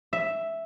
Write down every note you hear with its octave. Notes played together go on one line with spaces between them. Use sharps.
E5